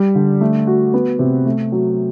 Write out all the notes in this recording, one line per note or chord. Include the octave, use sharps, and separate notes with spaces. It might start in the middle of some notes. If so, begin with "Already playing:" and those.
Already playing: G3
D3
A3
F#4
B3
C3
A3
F#3